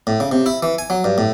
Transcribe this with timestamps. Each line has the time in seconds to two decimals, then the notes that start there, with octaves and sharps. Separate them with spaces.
0.07 A2
0.20 C#3
0.32 C3
0.46 E4
0.63 E3
0.78 G#5
0.90 F#3
1.04 G2
1.18 A2